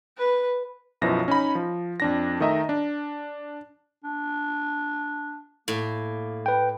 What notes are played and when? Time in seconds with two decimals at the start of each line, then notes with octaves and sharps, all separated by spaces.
0.17 B4
1.01 B1 F#2 F3 B3 E4 A#6
1.28 C#4 D#4 B5
1.55 F3
2.00 F2 D4 A#6
2.40 D#3 A3 D#5 E5 A#5
2.69 D4
4.04 D4
5.68 A2 A#3
6.46 B4 G5